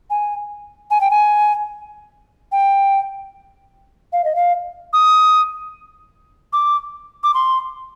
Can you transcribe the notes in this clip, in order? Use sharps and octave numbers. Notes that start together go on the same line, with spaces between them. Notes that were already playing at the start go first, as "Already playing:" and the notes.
G#5
G#5
G5
G#5
G5
F5
D#5
F5
D#6
D6
D6
C6